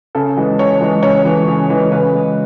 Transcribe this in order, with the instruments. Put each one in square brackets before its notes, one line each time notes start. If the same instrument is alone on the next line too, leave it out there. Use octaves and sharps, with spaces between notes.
[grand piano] C#3 A4
E3 G#3
C#3 C#5
E3 G#3
C#3 C#5
E3 G#3
C#3
E3 G#3
C#3 B4
G#3